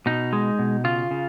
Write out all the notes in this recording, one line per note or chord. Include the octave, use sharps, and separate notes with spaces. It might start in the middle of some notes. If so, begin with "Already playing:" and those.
B2 D#4
G#3
B2
C#3 F4
C#3